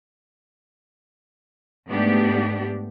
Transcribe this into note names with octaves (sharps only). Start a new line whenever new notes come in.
G#2 A3 B3 D4 G4